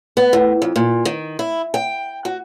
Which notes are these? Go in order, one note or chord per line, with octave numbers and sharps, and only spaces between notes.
B3
A2
F2
A#2
D#3
E4
G5
F#4